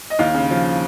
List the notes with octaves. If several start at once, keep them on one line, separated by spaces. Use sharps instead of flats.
D#5
D#2 F5
C#3
F3